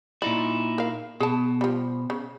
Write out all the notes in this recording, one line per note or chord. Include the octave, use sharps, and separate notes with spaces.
A#2 D#4 E4 D5
A#4 F5
B2 G#4 A5
F3 G3
C#3